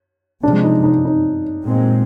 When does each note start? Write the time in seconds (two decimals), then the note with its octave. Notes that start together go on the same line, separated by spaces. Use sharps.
0.43 C3 F3 G#3 D4
0.64 D#4
0.84 D#4
1.05 D#4
1.66 A#2 G#3 C4